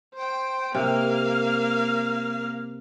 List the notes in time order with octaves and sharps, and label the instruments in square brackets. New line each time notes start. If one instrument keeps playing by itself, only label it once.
[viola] C5 G5
[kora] C3 [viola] A#3 F5